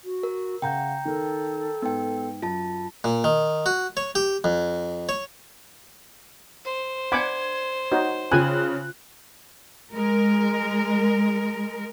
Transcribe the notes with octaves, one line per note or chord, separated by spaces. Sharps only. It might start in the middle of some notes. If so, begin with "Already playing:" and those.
F#4
A#4
C#3 F#5 G5 A#5 G6
D#3 A4 A#4
G#2 B3 G5
F#2 F4 A5
A#2
D#3
F#4
C#5
G4
F2
C#5
C5
D4 D5 F5 F#5 B5 D6 G#6
D#4 F#4 C#5
C#3 C#4 F4 G#5 F#6
G#3 A#4